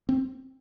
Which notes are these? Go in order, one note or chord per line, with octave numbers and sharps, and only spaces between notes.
C4